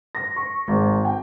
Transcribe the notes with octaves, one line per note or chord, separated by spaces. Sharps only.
A#6
C#6
G#1
G5